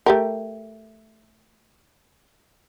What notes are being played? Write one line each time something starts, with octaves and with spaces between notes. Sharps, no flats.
A3 G4 A#4